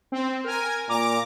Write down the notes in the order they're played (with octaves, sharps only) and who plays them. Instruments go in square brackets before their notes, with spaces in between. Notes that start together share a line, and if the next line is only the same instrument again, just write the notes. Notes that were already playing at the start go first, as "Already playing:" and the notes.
[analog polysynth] C4
A#4 G#5
[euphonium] A#2 [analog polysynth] A#5 D6